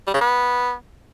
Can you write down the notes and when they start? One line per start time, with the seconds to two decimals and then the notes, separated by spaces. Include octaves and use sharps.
0.07 G3
0.14 C#3
0.21 B3